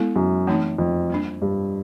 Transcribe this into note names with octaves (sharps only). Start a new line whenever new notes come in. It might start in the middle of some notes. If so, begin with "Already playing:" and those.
Already playing: G#3 B3 E4 A4
F#2
E3 A3 C4 D#4
F2
G3 A#3 D4
G2